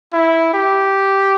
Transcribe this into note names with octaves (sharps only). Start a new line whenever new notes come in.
E4
G4